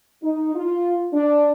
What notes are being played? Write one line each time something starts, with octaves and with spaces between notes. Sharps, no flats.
D#4
F4
D4